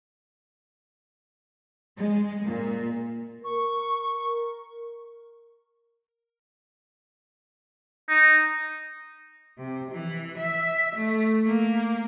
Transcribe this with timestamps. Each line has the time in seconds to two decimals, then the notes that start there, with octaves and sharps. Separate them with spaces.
1.97 G#3
2.46 A#2
3.44 A#4 C#6
8.09 D#4
9.58 C3
9.91 E3
10.38 E5
10.95 A3
11.46 A#3